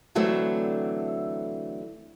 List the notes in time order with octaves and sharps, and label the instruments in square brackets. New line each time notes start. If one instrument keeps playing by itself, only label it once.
[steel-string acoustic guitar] D3 E3 F#3 A3 C4 D4